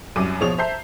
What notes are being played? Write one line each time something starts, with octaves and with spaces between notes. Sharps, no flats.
C2 F#2 D6 D#7
B2 F3 G#4 C#5 F7
C5 E5 A5 A#5 G6 C7